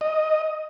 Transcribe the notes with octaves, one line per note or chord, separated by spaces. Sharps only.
D#5